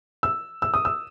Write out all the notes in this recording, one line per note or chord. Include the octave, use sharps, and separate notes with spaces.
E6
E6
D#6
E6